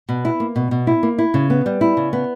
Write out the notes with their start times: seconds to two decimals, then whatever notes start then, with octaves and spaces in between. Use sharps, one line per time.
0.09 B2
0.25 E4
0.40 A#3
0.56 B2
0.71 B2
0.87 E4
1.03 A#3
1.18 E4
1.34 C#3
1.50 B3
1.66 G3
1.81 E4
1.97 C#3
2.13 B3